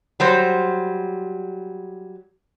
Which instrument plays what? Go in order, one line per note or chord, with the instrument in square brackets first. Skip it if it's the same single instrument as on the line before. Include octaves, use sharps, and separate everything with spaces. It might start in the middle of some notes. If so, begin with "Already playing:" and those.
[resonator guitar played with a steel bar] F#3 G3 C5